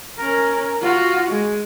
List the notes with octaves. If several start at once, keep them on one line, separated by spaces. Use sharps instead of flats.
C#4 A#4
F4 F#4
G#3